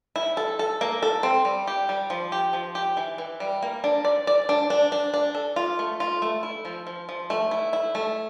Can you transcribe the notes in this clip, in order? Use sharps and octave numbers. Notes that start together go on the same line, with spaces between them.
E4
A4
A4
A#3
A4
C4
G3
G4
G3
F3
G4
F3
G4
E3
E3
G3
A#3
D4
D5
D5
D4
D4
D4
D4
A4
F4
A3
F4
A3
E4
F3
F3
F3
A3
E4
E4
A3